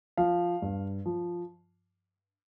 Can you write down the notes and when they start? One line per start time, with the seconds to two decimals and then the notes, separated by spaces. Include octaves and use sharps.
0.17 F3 F5
0.62 G2
1.06 F3